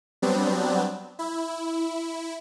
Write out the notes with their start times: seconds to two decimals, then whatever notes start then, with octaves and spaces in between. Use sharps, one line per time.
0.22 F#3 G3 B3 C4 D4
1.19 E4